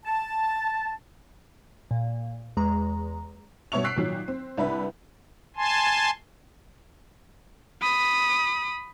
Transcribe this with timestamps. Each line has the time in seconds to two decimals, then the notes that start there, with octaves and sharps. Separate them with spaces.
0.06 A5
1.91 A#2
2.57 E2 G#3 A#5
3.72 G2 B2 C#5 E5 C#6 F7
3.84 E6 F#6 B6 C7 D7
3.96 A#2 D#3 F#3
4.28 C4
4.57 C2 D4 B4 E5
5.56 G#5 A5 C6
7.82 B5 D#6